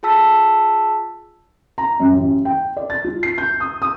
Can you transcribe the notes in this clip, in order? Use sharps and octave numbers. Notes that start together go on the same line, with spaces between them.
F4 G#4 A5 E6 B6
A#5
F#2
A1
G5
D5
A6
F4
C7
G6
D#6
D#6